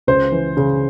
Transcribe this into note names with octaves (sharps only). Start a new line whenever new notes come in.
C#2 C5
E3
C#3